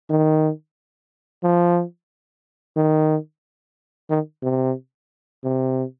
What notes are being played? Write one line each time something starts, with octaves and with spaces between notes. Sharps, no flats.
D#3
F3
D#3
D#3
C3
C3